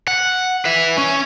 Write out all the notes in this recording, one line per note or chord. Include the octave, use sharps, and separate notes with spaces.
F#5
B4 E5
C#4